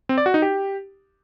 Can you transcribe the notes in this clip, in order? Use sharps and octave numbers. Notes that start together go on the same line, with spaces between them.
C4
D5
F#4
D#4
G4